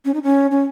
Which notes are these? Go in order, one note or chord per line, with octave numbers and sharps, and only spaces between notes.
C#4
D#4
C#4
C#4